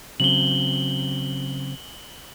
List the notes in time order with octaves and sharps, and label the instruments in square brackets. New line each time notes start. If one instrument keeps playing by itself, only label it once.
[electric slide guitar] C#3 F#3 C4 [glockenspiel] F#7 G7